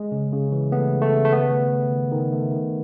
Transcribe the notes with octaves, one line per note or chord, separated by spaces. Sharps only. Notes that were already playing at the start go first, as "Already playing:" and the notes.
Already playing: G#3
C#3
C#3
E3
A3 B3
C#3
A3
C#3
A3
D#3 B3
A3
A3
D#3
D#3
A3
D#3